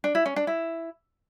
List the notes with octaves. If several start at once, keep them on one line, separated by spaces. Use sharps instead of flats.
D4
E4
C#4
D4
E4